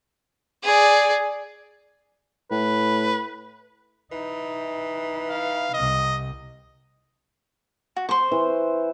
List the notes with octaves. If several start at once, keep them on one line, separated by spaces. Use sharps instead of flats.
G#4 D5
A2 B4
E3 D#4
F5
C2 C3 D#5
F#4
C5 C6 C#6
E3